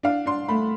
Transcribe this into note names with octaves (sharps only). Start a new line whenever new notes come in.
D4 F5
D4 C6
A3 B5